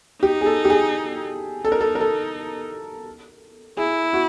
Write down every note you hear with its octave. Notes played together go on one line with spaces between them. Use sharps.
D#4 G4
G#4
A4
G4
G#4
D#4 A4
A#4
A4
A#4
A4
E4 G#4
F#4